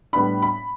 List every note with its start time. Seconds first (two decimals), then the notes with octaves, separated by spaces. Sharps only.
0.13 A2 G3 B3 D4 B5
0.42 B5